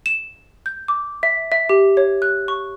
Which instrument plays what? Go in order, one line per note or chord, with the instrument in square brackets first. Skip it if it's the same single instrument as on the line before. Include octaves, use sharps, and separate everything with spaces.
[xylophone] E7
G6
D6
E5
E5
G4
C#5
F#6
C#6